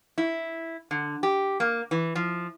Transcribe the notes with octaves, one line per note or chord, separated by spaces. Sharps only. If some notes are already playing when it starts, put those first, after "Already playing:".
E4
D3
G4
A#3
E3
F3